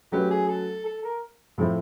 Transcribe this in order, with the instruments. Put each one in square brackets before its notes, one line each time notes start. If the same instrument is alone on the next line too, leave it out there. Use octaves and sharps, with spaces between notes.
[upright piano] F#3 A3 C#4 F#4 B4 [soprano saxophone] G4
[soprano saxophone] G#4
A4
A4
A#4
[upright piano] A2 F3 A3 C4 E4